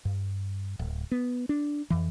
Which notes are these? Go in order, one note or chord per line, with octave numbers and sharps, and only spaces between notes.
G2
D1
B3
D4
F2 E3